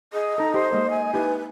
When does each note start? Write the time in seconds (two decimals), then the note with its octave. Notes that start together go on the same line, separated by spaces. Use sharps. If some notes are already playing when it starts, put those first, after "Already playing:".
0.13 G#4 D#5
0.38 D#4 A4 A#5
0.54 G4 C5
0.71 G#3 A#3 A#4
0.90 G#5
1.14 D#4 E4 G4 B4